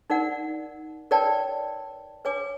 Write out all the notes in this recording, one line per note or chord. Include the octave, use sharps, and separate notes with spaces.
D#4 A#4 D5 F#5
A#4 B4 C#5 D5 G5 A5
B4 C#5 G#5 D6